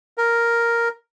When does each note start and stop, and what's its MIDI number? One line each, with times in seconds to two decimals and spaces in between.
0.18 0.88 70